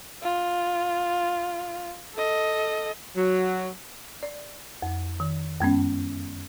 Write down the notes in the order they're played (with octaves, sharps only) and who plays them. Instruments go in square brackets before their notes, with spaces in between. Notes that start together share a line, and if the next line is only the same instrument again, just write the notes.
[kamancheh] F4
A4 D#5
[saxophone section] F#3
[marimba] D5
F2
D#3
F#2 G#3 B3 C#4